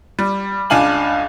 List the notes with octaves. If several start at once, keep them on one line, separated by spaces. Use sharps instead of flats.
G3
C#2 D4 F5 G#5 F#7